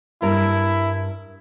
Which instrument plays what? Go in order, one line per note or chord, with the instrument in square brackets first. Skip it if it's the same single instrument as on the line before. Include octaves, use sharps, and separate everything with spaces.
[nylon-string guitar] G2 A#4 [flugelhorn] E4